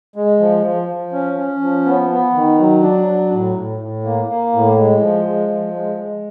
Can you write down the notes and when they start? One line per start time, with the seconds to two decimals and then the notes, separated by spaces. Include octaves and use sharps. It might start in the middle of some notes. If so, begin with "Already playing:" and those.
0.16 G#3
0.40 F3
0.64 F3
0.89 F3
1.12 C#4
1.37 C#4
1.61 F3
1.85 B3
2.10 B3
2.34 D#3
2.59 F#3
2.82 D4
3.07 F#3
3.32 A2
3.55 A2
3.79 A2
4.04 A#3
4.28 A#3
4.53 A2
4.77 G#3
5.01 F3
5.25 G#3
5.49 F3
5.74 G#3
5.98 G#3